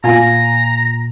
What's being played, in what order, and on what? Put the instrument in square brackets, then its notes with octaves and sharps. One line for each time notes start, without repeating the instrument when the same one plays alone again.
[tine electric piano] A#2 [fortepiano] F4 G#5 [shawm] A#5